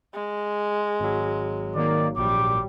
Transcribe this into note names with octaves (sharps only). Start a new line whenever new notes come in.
G#3
G#1 F#3
D#3 A#3 D5
A#1 G3 D6